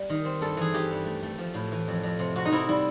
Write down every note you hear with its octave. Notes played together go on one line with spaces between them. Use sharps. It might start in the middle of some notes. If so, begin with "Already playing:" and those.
Already playing: G3
D#3
C4
G2 A4
E3 G#4
E3 G4
G2
A3
A3
F3
A2
E3
F2
F2
C3
C3 F#4
D#4
C3 E4
G3 E4